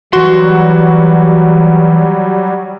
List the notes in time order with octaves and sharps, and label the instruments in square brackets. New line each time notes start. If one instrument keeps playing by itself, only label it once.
[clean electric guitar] E3 C6 [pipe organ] F#3 G3 [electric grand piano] F#4